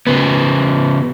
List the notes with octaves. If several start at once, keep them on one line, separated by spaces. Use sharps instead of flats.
C#3 B3